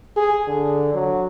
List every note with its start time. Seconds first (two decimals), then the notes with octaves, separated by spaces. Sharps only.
0.17 G#4
0.47 D3
0.94 F#3